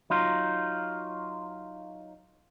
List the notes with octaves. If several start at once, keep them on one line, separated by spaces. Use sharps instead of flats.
F#3 D#4 F4